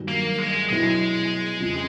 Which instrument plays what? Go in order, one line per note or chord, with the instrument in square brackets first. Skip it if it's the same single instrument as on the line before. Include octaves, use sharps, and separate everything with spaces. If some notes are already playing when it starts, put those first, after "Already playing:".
Already playing: [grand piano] G2 D#3 F#3
[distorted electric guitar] A#3
G#3
[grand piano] B2 F#3 B3 E4 [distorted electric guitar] G#3
[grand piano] F2 C#3 F3